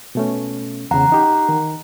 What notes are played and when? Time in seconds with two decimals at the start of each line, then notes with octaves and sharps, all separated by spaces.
0.15 B2 A3 C#4
0.91 E2 C#3 F#5 A#5
1.12 D#4 G4
1.49 D#3